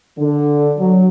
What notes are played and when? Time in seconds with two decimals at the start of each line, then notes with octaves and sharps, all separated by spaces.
0.18 D3
0.78 F#3